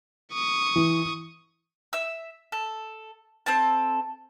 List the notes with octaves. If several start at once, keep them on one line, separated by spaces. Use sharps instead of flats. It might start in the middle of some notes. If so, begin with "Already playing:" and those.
C#6 D#6
E3
E5 E6
A4
C4 A4 A5